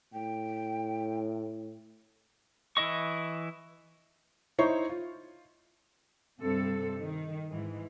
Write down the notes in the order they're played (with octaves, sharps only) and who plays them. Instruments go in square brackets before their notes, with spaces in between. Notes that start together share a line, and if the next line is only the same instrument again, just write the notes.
[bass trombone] A2 [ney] G5
[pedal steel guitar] E3 E4 D#5 C#6
[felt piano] D#4 E4 C5 C#5
F4
[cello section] G2 C3 C4 A4
D#3
G#2 E3 G#3